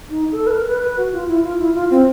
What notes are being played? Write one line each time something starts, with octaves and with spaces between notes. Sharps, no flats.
D#4
A4
B4
A#4
B4
B4
F#4
F4
E4
F4
E4
F4
C4